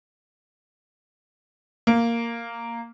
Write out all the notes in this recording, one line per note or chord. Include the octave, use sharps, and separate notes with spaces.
A#3